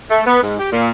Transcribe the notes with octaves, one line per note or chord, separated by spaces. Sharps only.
A3
B3
G#2
G4
A#2